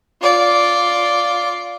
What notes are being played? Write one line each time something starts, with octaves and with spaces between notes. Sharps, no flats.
F4 D5